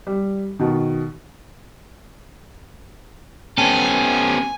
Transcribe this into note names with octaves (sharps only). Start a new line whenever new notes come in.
G3
B2 D#3
B3 C#4 G4 A4 G#5